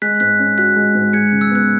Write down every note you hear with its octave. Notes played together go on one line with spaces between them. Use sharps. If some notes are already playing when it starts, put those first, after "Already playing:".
G#3 F#6 B6
G#2 F#6 B6
C#4
F#4 F#6 B6
G#3
G#2
G#3 G#6 C#7
C#3
E6 G#6
B3 F#6